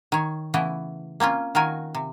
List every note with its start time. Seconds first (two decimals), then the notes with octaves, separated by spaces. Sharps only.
0.12 D#3 C#5
0.54 C#3 E3 A3 B3 E4
1.20 A#3 C4 C#4 F4
1.55 D#3 F4 F#4 A#4 G#5
1.95 C3